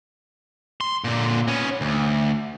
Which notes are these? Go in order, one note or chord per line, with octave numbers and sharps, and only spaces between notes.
C6
A#2 D3
B3 C#4
D2